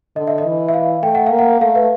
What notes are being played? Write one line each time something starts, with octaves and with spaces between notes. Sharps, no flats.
D3 D#5
E5
D#5
E3
E5
F5
A3 G5
F#5
A#3 F5
F#5
A3 F5
B4